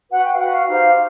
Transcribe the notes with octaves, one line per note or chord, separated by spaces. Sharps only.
F#4 B4 F#5
G5
F5
F#4 B4 F#5
F5
D#4 G4 C5 F5